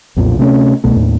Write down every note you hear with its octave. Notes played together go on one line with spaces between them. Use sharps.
B1 F2 A#2
C3 A3 B3 C#4
C2 B2 A3
D#2 A2